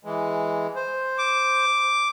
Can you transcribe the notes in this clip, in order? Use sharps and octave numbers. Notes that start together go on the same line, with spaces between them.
E3 G#3
C5
D6